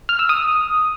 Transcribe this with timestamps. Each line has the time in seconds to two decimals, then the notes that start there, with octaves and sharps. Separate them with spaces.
0.09 F6
0.19 E6
0.29 D#6